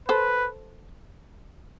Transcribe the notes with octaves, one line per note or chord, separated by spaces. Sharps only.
A4 B4 C5